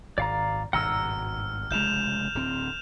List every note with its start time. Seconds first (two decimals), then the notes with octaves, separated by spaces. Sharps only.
0.18 G#1 D5 F5 A#5
0.73 G#1 G2 B2 F#5 A#5 E6 F6
1.71 F1 C#3 G#3 G6 E7 F7
2.35 D1 C4